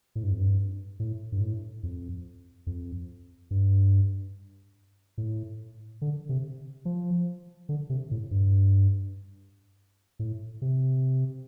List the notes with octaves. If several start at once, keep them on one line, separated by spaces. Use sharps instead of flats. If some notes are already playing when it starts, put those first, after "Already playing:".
A2
G2
F2
G2
A2
G2
A2
F2
F2
G2
A2
D3
C3
F3
D3
C3
A2
G2
A2
C3